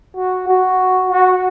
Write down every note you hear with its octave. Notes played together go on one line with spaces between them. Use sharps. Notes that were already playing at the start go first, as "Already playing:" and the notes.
F#4
F#4
F#4